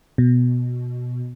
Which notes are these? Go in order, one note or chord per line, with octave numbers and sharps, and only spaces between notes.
B2